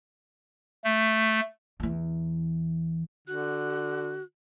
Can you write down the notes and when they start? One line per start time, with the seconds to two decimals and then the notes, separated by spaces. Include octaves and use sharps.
0.84 A3
1.80 E2 E3
3.28 D3 F#4 F#6